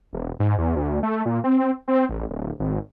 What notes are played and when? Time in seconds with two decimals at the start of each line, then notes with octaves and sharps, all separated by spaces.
0.13 E1
0.40 G#2
0.58 E2
0.76 D2
1.03 A3
1.26 A#2
1.44 C4
1.88 C4
2.09 A1
2.30 D1
2.60 G#1